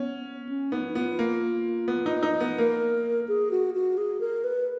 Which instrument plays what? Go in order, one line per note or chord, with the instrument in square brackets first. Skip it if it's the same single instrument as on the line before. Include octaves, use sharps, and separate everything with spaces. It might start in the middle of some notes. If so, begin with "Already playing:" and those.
Already playing: [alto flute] B3 [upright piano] C#4
[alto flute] C#4
[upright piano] B3 [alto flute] D#4
[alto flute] D#4
[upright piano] B3 [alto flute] F4
[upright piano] A#3
B3
D#4
D#4
B3
[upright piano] A#3 [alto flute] A#4
[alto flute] G#4
F#4
F#4
G#4
A#4
B4